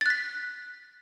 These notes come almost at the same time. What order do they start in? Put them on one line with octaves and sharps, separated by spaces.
A6 F#6 B6